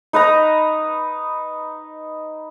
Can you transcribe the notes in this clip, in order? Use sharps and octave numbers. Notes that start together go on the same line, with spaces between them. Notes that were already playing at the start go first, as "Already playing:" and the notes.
D#4 B4 D#5 A#5